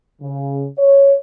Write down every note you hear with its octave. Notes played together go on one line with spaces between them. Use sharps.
C#3
C#5